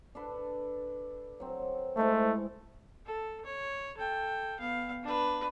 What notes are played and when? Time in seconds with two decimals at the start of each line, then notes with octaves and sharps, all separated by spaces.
0.15 D4 A4 B4
1.40 F#3 C4
1.97 G#2 G#3 A3 E4
3.06 A4
3.45 C#5
3.97 A4 G5
4.60 B3 F5
5.03 D4 B4